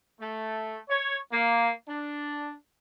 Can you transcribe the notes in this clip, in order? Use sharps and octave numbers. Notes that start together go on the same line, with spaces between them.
A3
C#5
A#3
D4